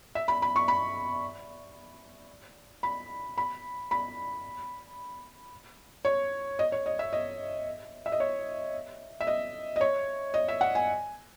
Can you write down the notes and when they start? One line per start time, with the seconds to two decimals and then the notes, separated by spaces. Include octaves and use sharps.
0.15 E5
0.28 B5
0.42 B5
0.56 C#6
0.68 B5
2.83 B5
3.38 B5
3.91 B5
6.05 C#5
6.59 D#5
6.72 C#5
6.86 D#5
6.99 E5
7.13 D#5
8.06 E5
8.12 D#5
8.20 C#5
9.20 E5
9.27 D#5
9.76 D#5
9.81 C#5
10.34 D#5
10.48 E5
10.61 F#5
10.75 G#5